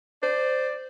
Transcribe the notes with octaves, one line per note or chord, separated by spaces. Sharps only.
C5 D5